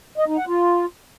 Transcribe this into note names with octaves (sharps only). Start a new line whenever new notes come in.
D#5
D#4
F#5
F4